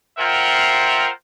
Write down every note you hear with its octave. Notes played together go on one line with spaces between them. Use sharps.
F4 A#4 C5 E5 F#5 G5